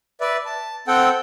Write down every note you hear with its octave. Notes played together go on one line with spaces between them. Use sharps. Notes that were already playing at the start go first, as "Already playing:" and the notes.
B4 D5 E5
A5
C4 A4 F#5 G5